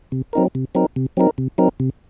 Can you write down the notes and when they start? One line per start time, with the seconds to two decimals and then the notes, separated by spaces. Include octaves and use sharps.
0.12 C3
0.33 F#3 C4 D#4 A#4
0.55 C3
0.75 F#3 C4 D#4 A#4
0.96 C3
1.17 F#3 C4 D#4 A#4
1.38 C3
1.58 F#3 C4 D#4 A#4
1.80 C3